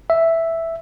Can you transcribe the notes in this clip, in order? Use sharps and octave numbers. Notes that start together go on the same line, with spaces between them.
E5